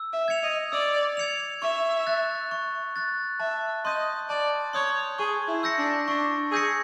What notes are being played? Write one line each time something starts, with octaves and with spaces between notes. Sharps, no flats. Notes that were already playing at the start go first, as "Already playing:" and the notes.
Already playing: E6
E5
G#6 C#7 F7
D#5
D5 E6
G#6 C#7 F7
E5 C#6
F#6 A6
C#6
F#6 A6
E5 A5
D#5 C6 D#6 G6
D5 A5
C#5 C6 D#6 G6
G#4 C#6
E4
E6 G6 A#6 C#7
D4
D4 C#6
G#4 E6 G6 A#6 C#7